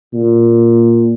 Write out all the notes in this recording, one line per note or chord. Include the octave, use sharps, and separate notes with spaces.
A#2